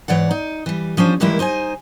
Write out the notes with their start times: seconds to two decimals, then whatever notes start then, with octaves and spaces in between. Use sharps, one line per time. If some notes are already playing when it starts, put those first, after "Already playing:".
0.08 G#2 E3 C#5 D5 F#5
0.31 D#4
0.66 E3 G3
0.97 F3 C#4 D4 C5
1.20 D#3 E3 G3 G#3 A#3 E4
1.39 D#4 C5 C#5 G#5